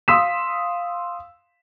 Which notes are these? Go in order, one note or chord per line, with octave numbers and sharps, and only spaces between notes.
F5 C6 D#6 E6 B6 E7